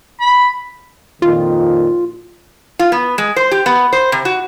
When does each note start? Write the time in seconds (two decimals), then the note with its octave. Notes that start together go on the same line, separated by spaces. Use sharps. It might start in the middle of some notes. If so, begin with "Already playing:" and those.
0.21 B5
1.22 F2 A#2 D#3 F4
2.79 F4
2.92 B3
3.18 G#3
3.36 C5
3.51 G4
3.66 B3
3.93 C5
4.12 C3
4.25 F#4